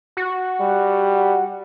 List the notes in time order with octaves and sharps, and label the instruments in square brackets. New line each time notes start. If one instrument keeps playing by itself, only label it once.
[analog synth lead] F#4
[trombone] G3